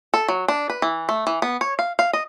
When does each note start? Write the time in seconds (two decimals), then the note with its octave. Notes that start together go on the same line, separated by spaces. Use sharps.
0.14 A4
0.28 F#3
0.48 D4
0.70 B4
0.82 E3
1.09 A3
1.27 E3
1.42 B3
1.61 C#5
1.79 F5
1.99 F5
2.13 D#5